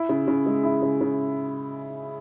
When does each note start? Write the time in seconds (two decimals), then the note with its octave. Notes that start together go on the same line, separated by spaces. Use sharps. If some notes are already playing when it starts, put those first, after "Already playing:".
Already playing: E4
0.09 C#3
0.28 C#3
0.46 G#3
0.63 E4
0.82 C#3
1.01 C#3